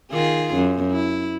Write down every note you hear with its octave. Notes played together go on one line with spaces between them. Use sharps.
D#3 F4 G#4
F#2
E4